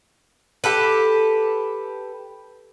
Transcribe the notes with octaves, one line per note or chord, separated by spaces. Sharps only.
G4 A4 B4